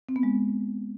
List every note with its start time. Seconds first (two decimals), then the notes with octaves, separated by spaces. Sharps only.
0.09 C4
0.16 B3
0.23 G#3